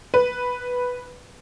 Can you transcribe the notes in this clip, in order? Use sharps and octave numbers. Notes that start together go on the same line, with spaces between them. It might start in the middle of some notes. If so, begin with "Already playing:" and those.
B4